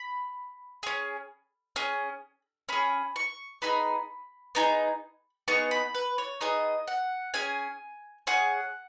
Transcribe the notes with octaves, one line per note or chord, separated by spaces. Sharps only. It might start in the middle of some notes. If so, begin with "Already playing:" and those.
Already playing: B5
C#4 G#4
C#4 G#4
C#4 G#4 B5
C#6
B3 D#4 G#4 B5
B3 D#4 G#4
B3 D#4 G#4 C#6
B5
B4
C#5
B3 D#4 G#4 D#5
F#5
C#4 G#4 G#5
C#4 G#4 F#5